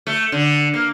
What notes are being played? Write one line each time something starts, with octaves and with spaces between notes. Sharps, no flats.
A3
D3
A#3